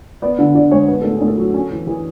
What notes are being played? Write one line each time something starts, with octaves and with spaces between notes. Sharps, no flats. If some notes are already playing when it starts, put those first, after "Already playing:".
B3 D5
D3
D3 D5
G#3 C#5
B3 B4
A2 A4
G#4
A2
A4
F#3
C#4
E3
E3 G#4